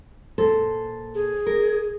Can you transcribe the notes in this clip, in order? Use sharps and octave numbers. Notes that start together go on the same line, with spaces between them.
A#2 A4 C5
G#4
A#4